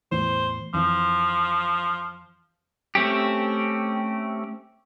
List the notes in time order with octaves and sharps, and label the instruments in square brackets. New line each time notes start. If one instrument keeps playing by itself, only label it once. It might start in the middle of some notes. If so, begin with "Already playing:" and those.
[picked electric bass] E2 A2 E3 [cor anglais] C5
[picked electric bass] F2 E3 [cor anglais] F3
[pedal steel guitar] A3 C4 C#4 G4